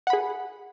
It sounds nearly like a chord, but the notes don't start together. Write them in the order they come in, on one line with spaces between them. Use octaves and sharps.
F#5 B5 G#4